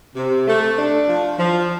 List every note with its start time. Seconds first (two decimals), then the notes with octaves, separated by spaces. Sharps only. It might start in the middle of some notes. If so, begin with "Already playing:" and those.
0.16 C3
0.47 A3
0.77 D4
1.07 F3
1.38 F3